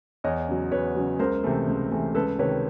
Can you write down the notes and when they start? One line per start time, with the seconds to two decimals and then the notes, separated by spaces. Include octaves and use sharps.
0.24 E2 C#5 D#5
0.48 C#3 F#3
0.72 E2 B4 C#5
0.96 C#3 F#3
1.19 C#2 A#4 C5
1.44 C3 E3 A3
1.67 C#2
1.91 C3 E3 A3
2.15 C#2 A4 B4
2.38 C3 D#3 B4 C#5